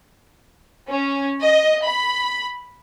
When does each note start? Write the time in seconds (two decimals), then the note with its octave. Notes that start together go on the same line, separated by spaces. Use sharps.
0.88 C#4
1.40 D#5
1.85 B5